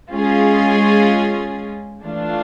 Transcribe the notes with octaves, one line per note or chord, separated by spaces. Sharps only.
G#3 C#4 F4 G#4
E3 A3 D4 F4